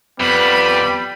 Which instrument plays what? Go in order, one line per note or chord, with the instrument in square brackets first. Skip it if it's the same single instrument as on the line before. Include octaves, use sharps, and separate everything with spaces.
[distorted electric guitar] F2 [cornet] G3 [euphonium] B3 [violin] B5